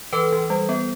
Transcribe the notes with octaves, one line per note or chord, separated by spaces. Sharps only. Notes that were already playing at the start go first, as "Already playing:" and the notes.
E3 A4 B4
E3
G3
B3